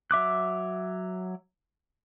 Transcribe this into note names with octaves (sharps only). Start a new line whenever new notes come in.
F#3 E5 D6 F#6